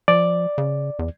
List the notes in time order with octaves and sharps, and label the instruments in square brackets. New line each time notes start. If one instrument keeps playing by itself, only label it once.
[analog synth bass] F3 [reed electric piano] D5
[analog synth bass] C#3
E2